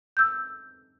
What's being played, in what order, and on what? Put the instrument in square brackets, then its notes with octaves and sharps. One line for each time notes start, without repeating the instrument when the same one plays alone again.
[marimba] E6 G6